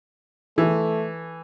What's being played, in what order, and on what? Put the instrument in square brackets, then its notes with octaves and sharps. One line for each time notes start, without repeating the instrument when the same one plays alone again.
[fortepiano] E3 [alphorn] A3